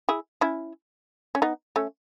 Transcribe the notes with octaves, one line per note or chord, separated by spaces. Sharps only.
E4 G#4
C#4 E4
C#4
B3 D#4
A3 C#4